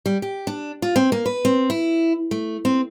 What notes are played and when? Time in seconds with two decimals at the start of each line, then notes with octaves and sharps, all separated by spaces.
0.06 G3
0.22 G4
0.47 D4
0.82 F4
0.96 C4
1.12 A#3
1.26 B4
1.45 C4
1.70 E4
2.31 A3
2.65 C4